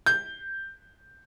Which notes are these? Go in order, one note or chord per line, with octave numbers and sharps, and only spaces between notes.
G6